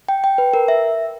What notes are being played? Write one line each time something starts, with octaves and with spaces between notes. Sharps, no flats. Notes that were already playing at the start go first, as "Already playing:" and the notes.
G5
G5
B4
A#4
E5